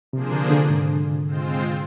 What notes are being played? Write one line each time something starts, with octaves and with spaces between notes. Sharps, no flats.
C3 F3 A#3 D4 G#4 C5
D3
D3
G#2
G#3 C4 F4 C5